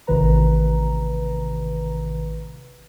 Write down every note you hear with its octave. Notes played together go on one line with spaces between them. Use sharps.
A1 C3 D#3 B4 A#5